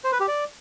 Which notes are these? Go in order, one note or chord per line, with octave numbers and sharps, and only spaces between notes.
C5
B4
G4
D5